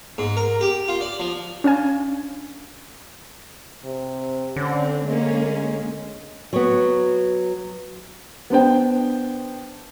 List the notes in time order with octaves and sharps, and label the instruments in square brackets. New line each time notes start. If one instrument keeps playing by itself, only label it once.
[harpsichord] G#2
A#4
G4
F4
D5
F3
[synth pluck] C#4 D4 F5 G#5
[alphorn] C3
[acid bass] D3 [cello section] C4 [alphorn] C#4
[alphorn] G#3 [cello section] A#3 C#4
[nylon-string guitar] F#3 B3
[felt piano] B3 D4 C5 G5